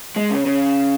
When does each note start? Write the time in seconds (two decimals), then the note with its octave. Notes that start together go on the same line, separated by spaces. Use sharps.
0.16 G#3
0.31 C#3
0.46 C#3